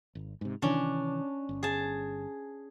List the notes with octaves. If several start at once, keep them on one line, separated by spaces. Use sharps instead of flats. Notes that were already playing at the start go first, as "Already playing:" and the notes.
G#1
G#2 C3
C3 D#3 E3 C#4 D4
G1
G#4 A5